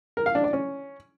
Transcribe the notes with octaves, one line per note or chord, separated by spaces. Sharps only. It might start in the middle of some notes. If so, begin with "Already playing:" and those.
A#4
F5
D4
D5
C#4